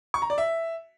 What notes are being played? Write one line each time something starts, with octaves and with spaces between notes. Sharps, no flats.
C#6
A#5
D5
E5